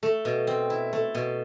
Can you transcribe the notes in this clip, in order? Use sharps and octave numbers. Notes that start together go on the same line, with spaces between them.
A3
B2
C4
E4
A3
B2